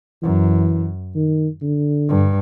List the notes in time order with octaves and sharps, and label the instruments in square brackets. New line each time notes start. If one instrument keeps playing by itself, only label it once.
[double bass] F#2 [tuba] E3
[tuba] D#3
D3
[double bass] G2